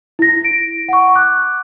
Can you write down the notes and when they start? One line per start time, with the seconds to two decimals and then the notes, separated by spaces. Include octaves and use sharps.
0.19 E4 A#6
0.44 D7
0.89 F#5 C#6
1.15 D6 F#6